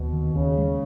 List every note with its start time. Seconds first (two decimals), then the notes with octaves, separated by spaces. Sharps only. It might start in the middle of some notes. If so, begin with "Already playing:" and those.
Already playing: D#2 B2
0.13 D#3
0.35 D#2 C#3
0.58 G#3